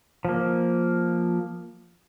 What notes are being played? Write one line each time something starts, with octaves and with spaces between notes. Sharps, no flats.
F3 A#3